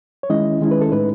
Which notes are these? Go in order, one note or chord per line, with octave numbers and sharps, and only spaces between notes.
C#5
D#3 G#3 C#4 E4 D#5
D#3 G#3 C#4 E4
B4
A4
A2 G#3 D#4 B4